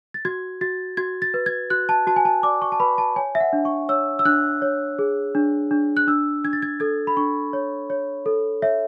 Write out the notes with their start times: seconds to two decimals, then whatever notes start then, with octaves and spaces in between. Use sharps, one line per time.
0.14 A6
0.25 F#4 G#6
0.61 F#4 A6
0.97 F#4 G#6
1.22 A6
1.34 B4
1.46 G#6
1.70 F#4 F#6
1.89 A5
2.07 F#4 A5
2.16 G#5
2.25 A5
2.43 D5 D6
2.62 C#6
2.72 A5
2.80 B4 B5
2.98 A5
3.16 C#5 G#5
3.35 E5
3.41 F#5
3.53 D4
3.65 C#6
3.89 C#5 E6
4.19 E6
4.25 D4 F#6
4.62 C#5
4.99 G#4
5.35 D4
5.71 D4
5.97 F#6
6.07 D4 E6
6.44 D4 G#6
6.53 A6
6.62 G#6
6.80 A4 G#6
7.07 B5
7.17 D4 C#6
7.53 C#5
7.90 C#5
8.26 A4
8.62 C#5 E5